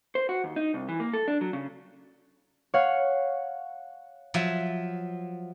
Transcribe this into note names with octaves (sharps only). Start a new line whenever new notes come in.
C5
F#4
D#2
D#4
C2
E3
A#3
A4
D4
F#3
C#3
C#5 F5 F#5
F3 F#3 E5